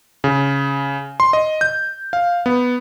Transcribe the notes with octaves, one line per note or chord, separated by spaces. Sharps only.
C#3
C6
D#5
G6
F5
B3